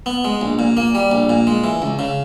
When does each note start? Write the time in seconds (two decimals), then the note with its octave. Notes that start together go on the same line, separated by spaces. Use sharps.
0.06 B3
0.24 G#3
0.41 A#1
0.59 A#2
0.77 A#3
0.95 G3
1.11 A#1
1.29 A#2
1.47 G#3
1.64 E3
1.82 C#2
1.99 C#3